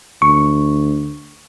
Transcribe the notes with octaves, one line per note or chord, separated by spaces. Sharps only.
D2 C#6